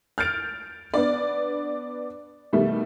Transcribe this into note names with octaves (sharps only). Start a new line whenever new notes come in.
F6 G6 A6 D7 F7
B3 D4 D5
B2 D#3 G3 A3